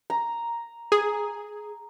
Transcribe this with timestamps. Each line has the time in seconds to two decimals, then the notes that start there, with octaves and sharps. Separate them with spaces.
0.10 A#5
0.92 G#4